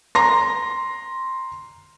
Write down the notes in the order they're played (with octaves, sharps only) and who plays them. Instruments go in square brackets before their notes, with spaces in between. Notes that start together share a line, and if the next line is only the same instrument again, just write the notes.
[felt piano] A#5 C6 A#6